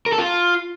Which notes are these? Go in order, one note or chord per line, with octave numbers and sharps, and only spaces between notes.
A#4
A4
F4